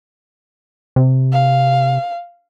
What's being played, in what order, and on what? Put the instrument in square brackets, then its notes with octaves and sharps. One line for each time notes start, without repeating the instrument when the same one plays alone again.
[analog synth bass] C3
[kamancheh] F5